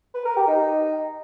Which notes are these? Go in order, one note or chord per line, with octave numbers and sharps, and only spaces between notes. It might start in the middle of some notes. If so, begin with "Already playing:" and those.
B4
A#4
G4
D#4